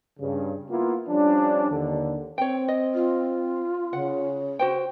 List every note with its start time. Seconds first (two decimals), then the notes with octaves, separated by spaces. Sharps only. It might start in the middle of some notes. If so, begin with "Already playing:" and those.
0.20 G2 C#3
0.70 A#3 B3 E4 F4
1.09 F3 G3 C#4 D4
1.70 D#2 D3
2.38 C4 C#5 G5
2.68 D#5
2.94 F4
3.93 C#3 F#5
4.59 F#4 C5 G5